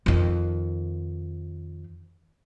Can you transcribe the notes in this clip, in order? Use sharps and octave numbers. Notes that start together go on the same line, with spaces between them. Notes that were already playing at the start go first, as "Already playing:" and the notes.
F2 D#3